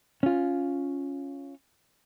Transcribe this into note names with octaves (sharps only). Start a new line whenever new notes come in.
C#4 F4